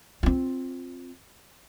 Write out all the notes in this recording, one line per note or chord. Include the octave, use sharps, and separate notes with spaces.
C4 F4